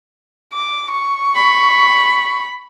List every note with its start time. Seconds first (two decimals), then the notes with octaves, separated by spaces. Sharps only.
0.53 D6
0.91 C#6
1.35 B5